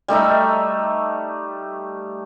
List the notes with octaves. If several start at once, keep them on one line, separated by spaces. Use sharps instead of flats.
G3 A3 D#4 E5